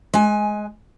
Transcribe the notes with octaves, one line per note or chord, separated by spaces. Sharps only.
G#3 G#5